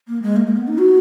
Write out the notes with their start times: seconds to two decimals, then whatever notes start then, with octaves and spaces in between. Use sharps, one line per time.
0.08 A#3
0.23 G#3
0.36 A#3
0.47 A#3
0.57 B3
0.68 D#4
0.78 F#4